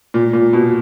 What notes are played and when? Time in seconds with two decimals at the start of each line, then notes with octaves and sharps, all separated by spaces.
0.14 A#2
0.33 A#2
0.53 B2